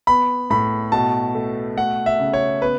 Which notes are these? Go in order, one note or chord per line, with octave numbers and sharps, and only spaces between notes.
B3 B5
A2 B5
B2 A5
A3
A3 F#5
E5
C#3
C#5
B3 B4